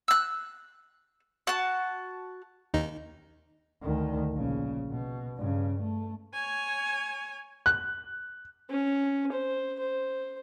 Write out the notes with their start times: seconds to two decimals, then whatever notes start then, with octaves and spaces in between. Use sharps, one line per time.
0.08 E6 F#6
1.47 F#4 A5
2.74 D#2 D#4
3.82 D2 D#3
4.33 A#1 C#3
4.90 B2
5.37 G2 C#3
5.81 A3
6.33 C#5 G#5
7.66 F#6
8.70 C#4
9.32 C5
9.80 C5